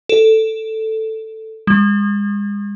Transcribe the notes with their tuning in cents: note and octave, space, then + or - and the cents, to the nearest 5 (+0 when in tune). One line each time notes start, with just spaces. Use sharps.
A4 +5
G#3 -35